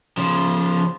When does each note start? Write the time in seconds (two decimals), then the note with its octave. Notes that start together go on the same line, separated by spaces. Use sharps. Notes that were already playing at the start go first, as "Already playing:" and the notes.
0.17 C#3 F3